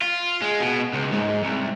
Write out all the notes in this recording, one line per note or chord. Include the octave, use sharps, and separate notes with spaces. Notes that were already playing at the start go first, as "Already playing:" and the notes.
F4
G#3
B2
C#2
G#2
C2